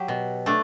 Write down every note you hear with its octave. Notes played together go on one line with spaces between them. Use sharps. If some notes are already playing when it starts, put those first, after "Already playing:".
Already playing: F#3 G4
B2
A3 D4